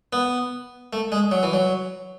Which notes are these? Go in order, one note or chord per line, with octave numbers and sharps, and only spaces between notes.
B3
A3
G#3
F#3
E3
F#3